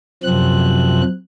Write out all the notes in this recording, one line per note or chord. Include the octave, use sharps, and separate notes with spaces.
F#2 C3 F3 C4 F#6